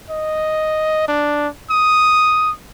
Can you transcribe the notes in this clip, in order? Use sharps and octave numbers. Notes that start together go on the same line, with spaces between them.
D#5
D4
D#6